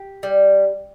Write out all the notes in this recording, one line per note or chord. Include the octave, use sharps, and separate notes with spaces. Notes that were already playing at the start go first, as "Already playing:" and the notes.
Already playing: G4
G3